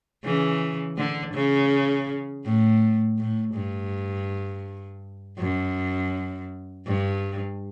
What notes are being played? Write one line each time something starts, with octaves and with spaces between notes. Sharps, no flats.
C#3 E3
D3
C#3
A2
A2
G2
F#2
G2